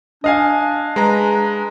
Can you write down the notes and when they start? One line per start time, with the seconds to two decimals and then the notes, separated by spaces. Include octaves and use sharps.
0.24 D4 D#5 F5 G#5
0.96 G#3 B4 A#5